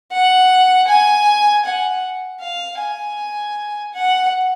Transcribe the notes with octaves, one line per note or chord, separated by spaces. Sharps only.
F#5
G#5
F#5
F5
G#5
F#5